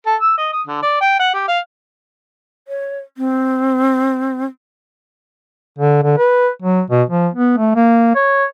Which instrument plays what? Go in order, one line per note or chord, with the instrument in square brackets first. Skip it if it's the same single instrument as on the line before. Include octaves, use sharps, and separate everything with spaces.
[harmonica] A4
E6
D#5
D#6
D3
D5
G5
F#5
G4
F5
[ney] C#5
C4
[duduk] D3
D3
B4
F#3
B2
F3
B3
A3
A#3
C#5